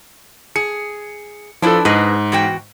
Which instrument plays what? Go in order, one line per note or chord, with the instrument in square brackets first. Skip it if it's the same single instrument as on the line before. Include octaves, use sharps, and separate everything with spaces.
[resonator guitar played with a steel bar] G#4 [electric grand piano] C#7
[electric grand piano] F3 A4 [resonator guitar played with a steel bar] D4 E4 B4
[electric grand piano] G#2 [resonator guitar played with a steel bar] G#4 B4 D#5
[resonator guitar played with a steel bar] E2 F#4 G5